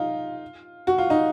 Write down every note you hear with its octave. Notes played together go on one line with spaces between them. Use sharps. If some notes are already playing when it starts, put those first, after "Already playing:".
Already playing: D#4 F4
F#4
F4
D#4